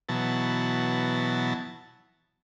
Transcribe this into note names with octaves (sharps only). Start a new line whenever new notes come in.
B2 E3 F#3 A5